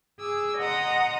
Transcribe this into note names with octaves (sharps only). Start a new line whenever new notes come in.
G#4 D6 E6
D#5 F#5 A#5 C6 D#6